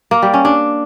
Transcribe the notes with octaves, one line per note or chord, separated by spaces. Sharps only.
A#3
G3
C#4
D4